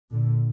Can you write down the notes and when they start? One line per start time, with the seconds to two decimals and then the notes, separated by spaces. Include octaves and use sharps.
0.11 A#2 D3